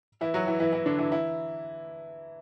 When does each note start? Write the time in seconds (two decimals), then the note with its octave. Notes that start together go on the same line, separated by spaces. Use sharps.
0.21 E3 E4
0.34 F#3 F#4
0.47 E3 E4
0.60 E3 E4
0.73 E3 E4
0.86 D3 D4
0.99 E3 E4
1.11 E3 E4